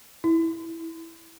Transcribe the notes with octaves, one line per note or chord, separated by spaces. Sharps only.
E4